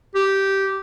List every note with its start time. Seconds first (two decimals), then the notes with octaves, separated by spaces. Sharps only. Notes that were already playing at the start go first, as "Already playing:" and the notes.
0.15 G4